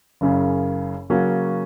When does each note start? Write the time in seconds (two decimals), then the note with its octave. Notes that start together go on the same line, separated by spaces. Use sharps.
0.21 F#1 F#2 C#3
1.10 C#3 F#3 A#3 C#4 F#4